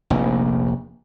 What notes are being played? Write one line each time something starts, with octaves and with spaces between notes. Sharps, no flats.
F1 A#1